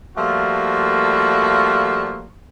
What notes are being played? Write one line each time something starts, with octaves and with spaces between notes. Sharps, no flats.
F3 G3 A3 A#3 F4 F#4